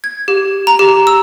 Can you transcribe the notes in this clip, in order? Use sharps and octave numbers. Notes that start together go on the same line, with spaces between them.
G#6
G4
A#5
G4
E6